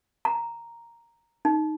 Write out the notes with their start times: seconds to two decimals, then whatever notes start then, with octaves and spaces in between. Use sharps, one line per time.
0.25 A#5
1.45 D#4